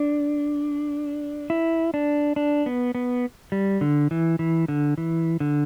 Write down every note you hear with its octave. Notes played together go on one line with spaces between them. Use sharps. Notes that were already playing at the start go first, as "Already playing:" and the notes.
Already playing: D4
E4
D4
D4
B3
B3
G3
D3
E3
E3
D3
E3
D3